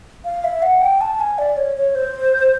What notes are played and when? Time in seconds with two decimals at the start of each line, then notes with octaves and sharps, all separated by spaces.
0.25 F5
0.44 E5
0.62 F#5
0.81 G5
1.01 A5
1.20 G#5
1.38 D5
1.57 C#5
1.77 C#5
1.95 C5